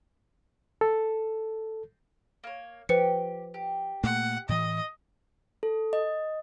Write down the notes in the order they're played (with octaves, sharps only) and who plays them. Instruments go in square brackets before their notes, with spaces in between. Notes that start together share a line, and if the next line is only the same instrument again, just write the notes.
[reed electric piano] A4
[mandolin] A#3 C#5
[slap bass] F3 [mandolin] G4 [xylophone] B4 C5 C#7
[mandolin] G4
[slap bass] A#2 A3 A#3 [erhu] F#5
[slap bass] A2 E3 [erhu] D#5
[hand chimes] A4
D#5